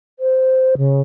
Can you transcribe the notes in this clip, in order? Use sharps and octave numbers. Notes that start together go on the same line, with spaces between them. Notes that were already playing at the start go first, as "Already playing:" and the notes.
C5
C#3